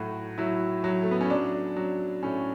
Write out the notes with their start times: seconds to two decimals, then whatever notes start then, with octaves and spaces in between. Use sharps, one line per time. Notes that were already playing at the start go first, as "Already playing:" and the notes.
Already playing: A2 F#3 F#4
0.38 F#3 E4
0.84 F#3
1.02 A3
1.11 B3
1.21 C#4
1.30 F#3 D4
1.76 F#3
2.23 A2 C#4